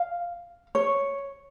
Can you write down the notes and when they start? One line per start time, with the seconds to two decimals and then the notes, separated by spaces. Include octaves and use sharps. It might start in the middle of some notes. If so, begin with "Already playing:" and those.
Already playing: F5
0.75 C#5